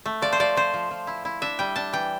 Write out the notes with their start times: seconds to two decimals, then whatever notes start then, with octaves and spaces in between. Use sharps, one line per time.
0.06 A3
0.22 F3 D5
0.32 C5
0.40 F3 D5
0.57 F3 C5
0.74 F3
0.91 F3
1.07 E4
1.25 E4
1.42 D4 E5
1.59 G3 G5
1.76 D4 A5
1.93 E3 G5